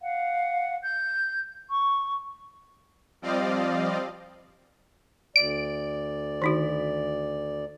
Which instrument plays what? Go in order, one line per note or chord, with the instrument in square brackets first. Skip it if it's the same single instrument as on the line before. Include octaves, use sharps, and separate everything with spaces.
[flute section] F5 F#5
G6
C#6
[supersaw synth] F3 G3 C4 D5 D#5 F5
[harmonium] D2 D5 [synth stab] D7
[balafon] D#3 D#4 F#4